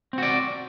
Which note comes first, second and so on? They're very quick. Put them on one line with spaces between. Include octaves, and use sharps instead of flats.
C4 F#4 D5